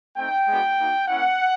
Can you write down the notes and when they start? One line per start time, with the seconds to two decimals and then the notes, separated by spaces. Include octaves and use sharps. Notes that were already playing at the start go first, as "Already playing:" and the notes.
0.17 A3 C4 D#4 G5
0.48 G#3 B3 D4 F#4
0.78 A#3 D#4 F#4
1.08 A#3 C#4 E4 F#5